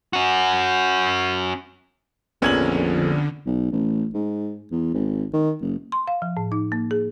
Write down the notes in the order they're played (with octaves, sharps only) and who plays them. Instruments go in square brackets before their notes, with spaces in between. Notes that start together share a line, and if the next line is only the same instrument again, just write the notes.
[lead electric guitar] C#4 F#4
[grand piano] A#1 G#6 F#7 [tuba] F2 [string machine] D3 [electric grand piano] A#3 B3 C#4
[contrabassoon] B1
A1
G#2
E2
G#1
D#3
F#1
[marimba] C6
F5
F3
A2
D#4
A#3
G#4